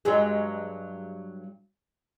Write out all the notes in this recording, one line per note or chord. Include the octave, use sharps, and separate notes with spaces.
G2 F#3 G#3